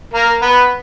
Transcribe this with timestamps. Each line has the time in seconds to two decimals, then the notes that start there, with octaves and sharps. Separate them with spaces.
0.13 A#3 A#4
0.41 B3 B4